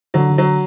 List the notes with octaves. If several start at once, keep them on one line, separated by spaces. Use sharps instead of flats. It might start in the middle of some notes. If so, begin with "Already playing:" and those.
D3 F#3
D3
F#3